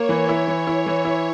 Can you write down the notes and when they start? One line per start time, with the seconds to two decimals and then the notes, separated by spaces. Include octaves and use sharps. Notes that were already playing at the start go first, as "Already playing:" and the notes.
Already playing: A#3 C#5
0.09 E3
0.29 E4
0.48 E3
0.67 E4
0.86 E3
1.05 E4